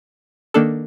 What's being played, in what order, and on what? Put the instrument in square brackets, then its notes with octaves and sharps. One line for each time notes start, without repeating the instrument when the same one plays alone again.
[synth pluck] D#3 A#3 D4 A4